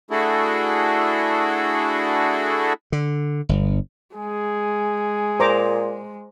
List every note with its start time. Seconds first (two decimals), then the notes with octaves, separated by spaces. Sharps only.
0.11 A3 D4 E4 F#4 G#4 A4
2.92 D3
3.49 G1
4.15 G#3 G#4
5.40 A#2 C5 A#5 D6